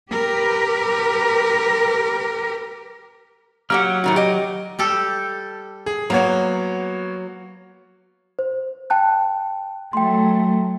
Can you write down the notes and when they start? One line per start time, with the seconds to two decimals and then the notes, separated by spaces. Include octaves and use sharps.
0.12 G4 A#4 B4
3.70 F#3 A#3 G4 F#5 F6
4.04 A2 D#3 F#4
4.16 G4 D#5
4.79 G3 G4 A4
5.86 G#4
6.10 F#3 A#3 B3 C#5
8.39 C5
8.90 G5 A5 F#6
9.93 F#3 A3 G5 C6